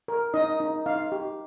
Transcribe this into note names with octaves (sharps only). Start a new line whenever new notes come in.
A#4
D#4 D#5
D#4
D#4 F5
G4